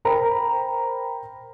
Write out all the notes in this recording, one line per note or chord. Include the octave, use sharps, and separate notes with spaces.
A#4 C5 G5 A#5 B5